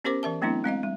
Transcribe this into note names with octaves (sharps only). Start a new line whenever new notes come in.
B3 C#4 G4 A#4 C5 D6
E3 A#4 E5 A5
F#3 A3 B3 C4 D4 E4
G#3 C4 D#5 F5
G3